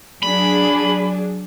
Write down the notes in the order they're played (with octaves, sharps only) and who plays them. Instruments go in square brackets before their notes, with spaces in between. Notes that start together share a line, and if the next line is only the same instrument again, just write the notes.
[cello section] F#3 D4 G#4 [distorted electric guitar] B5